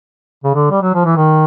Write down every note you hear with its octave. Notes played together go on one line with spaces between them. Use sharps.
C#3
D3
G3
F#3
F3
E3
D#3